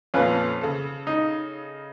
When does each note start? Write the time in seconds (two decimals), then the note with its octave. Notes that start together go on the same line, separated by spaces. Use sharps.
0.14 F2 A#2 C#4 F4 B4
0.61 C#3 A4
1.07 D#4